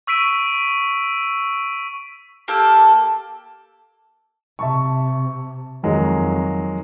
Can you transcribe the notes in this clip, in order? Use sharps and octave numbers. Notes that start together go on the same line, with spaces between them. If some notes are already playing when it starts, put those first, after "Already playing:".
C#6 E6 B6 D7 D#7
A#3 G4 A4 E6
C3 E5 A5 C#6
F2 D#3 F#3 G#3